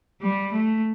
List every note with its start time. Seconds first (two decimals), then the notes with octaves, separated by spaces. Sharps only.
0.22 G3
0.52 A3